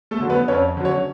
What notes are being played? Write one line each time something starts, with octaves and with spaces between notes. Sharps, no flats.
A3 A4
D3 F#3
B3 B4
F2 C#4 C#5
D3 F#3
C#4 C#5